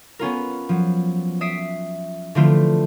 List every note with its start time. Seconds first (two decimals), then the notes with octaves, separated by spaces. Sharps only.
0.19 B3 C#4 F4 A#4
0.69 F3 F#3
1.41 E5 D#6 B6 C7 D7
2.35 D3 E3 F3 A3 C4 F4